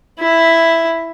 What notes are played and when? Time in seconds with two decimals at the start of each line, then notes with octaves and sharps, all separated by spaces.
0.20 E4 E5